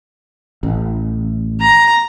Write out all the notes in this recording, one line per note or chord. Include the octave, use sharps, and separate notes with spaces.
A1
A#5